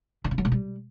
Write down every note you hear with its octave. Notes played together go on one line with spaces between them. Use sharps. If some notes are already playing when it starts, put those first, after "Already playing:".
D3
C#3
F#3
B2
G3